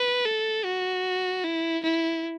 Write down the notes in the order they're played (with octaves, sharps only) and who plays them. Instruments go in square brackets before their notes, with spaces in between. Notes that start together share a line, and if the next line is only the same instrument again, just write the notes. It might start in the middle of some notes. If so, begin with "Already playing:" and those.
Already playing: [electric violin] B4
A4
F#4
E4
E4